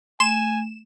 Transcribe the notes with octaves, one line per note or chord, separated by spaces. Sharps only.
A3 G#5 C6 E7